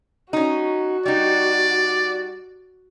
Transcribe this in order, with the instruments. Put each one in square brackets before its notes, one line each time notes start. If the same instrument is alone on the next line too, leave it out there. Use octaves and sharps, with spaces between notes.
[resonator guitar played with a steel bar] C#4 D#4 [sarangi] F#4
[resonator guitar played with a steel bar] G3 D#4 [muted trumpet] D5